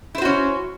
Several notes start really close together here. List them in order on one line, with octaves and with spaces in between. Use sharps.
E4 C5 F#4 C#4